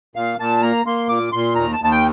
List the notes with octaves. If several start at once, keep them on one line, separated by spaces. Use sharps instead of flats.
A#2 F5
A#2 A5
A#3 A#5
A#3 C6
A#2 D6
A#2 C6
D#2 A#5
A5
D#2
A5
G5